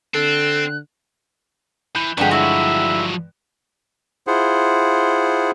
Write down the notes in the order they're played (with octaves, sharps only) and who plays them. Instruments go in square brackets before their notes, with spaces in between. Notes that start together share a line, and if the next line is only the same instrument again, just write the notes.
[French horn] D3 [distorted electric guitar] C4 [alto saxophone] A4 [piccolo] F#6
[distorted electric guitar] E3 [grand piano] B5 F#6 G6
[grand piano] G2 D3 G#3 [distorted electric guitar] F3 F#3 [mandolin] G4 F#5
[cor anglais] E4 [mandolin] F#4
[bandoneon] E4 F4 G#4 C5 F#5